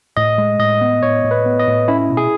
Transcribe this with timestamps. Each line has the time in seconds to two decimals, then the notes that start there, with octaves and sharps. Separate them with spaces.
0.17 A2 D#5
0.38 G#3
0.59 A2 D#5
0.81 B3
1.03 A2 C#5
1.24 A2
1.31 B4
1.46 B3
1.60 D#5
1.68 A2
1.88 C#4 E4
2.10 B2
2.17 G#4